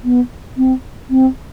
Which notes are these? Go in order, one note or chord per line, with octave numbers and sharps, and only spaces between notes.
B3
C4
C4